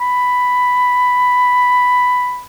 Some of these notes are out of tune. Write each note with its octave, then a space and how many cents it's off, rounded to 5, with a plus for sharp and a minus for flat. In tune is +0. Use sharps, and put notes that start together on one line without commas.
B5 +5